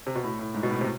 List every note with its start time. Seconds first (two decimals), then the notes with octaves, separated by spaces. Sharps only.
0.07 C3
0.15 B2
0.24 A2
0.39 A2
0.54 G#2
0.63 B2
0.70 A2
0.81 C3